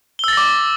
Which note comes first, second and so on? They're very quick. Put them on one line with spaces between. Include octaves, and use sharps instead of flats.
G7 E6 A6 A#6 D6